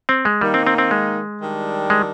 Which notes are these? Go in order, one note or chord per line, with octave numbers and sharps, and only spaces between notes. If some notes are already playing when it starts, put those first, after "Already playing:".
C4
G#3
D#3 G3 A#3 D#4
C4
C4
C4
G#3
D#3 G3 D4
G#3